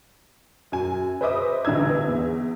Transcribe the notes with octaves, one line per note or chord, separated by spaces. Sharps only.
F#2 G#5
B4 C5 D#5 E5 D6 D#6
A1 D3 D#4 B4 E6 G#6
B3
E2